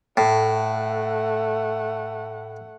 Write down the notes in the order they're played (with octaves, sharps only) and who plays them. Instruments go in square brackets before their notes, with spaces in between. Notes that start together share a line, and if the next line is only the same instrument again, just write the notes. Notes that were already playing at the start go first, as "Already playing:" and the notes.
[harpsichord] A2 [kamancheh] A3 F#5